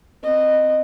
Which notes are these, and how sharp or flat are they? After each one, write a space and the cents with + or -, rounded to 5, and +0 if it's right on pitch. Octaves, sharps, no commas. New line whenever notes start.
C4 +0 D#5 -15